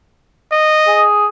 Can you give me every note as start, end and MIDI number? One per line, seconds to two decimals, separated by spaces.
0.52 1.07 75
0.88 1.27 68